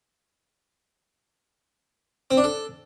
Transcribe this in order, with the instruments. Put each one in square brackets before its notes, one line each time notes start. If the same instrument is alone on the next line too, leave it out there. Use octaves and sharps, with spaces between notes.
[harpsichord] C4
D4
A4